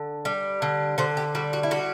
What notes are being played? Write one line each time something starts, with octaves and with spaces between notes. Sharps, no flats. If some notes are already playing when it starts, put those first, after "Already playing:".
Already playing: D3
G3
D3
D3 C5
G4
G3 F#4
F#4
E4
G3 F#4